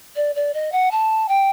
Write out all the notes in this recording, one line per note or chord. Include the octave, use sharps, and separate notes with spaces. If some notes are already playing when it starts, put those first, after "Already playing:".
D5
D5
D#5
F#5
A5
G5